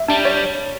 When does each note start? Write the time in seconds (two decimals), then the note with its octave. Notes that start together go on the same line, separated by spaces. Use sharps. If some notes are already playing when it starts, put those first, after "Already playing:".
Already playing: E5
0.08 G3 D4
0.25 C#5